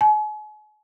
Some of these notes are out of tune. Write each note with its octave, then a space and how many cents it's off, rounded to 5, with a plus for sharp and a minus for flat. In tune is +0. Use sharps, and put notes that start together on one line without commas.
G#5 +40